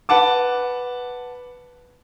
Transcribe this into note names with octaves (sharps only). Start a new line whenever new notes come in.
B4 F#5 A5 D6